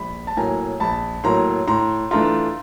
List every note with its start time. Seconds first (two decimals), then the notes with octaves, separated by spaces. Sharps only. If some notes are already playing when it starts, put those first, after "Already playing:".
Already playing: A#1 B5
0.27 A5
0.37 A2 F#3 A#3 G#5 A#5
0.80 A#1 A5 B5
1.24 A2 F#3 A#3 A#5 C6
1.68 A2 A#5 C6
2.11 E3 A3 D4 F4 A#5 C6